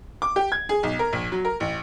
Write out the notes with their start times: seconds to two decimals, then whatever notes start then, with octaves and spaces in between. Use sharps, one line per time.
0.22 D6
0.36 G4
0.52 G#6
0.69 G#4
0.83 B1
0.99 A#4
1.13 A#1
1.32 F#3
1.45 A#4
1.60 A1